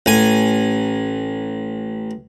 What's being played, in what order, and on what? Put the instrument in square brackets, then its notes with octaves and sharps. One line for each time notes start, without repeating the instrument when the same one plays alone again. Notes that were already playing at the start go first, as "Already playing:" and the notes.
[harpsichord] A1 G#5